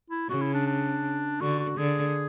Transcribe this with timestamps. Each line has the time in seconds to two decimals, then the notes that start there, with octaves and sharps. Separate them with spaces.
0.10 E4
0.29 C#3 F#4
0.41 E4
0.53 D4
0.67 D4
1.40 D3 F#4
1.59 F#4
1.77 D3 G#4